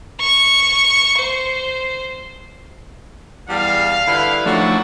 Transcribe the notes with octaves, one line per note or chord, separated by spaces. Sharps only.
C#6
C5
E2 G3 F5
G2 D3 E4 B4
D#3 F3 F#3 A3 D4 F#4